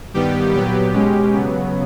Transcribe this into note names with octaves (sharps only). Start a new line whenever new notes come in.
G2 D#3 G3 B3 G4
A#2 F#3 B3 G4
B2 G#3 C#4
C#3 F#3 B3